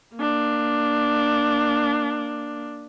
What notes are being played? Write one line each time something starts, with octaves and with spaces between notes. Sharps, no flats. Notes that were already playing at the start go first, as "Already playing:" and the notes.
A#3 D4